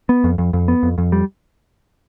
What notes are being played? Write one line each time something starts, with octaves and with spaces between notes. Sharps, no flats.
B3
F2
F2
F2
B3
F2
F2
G3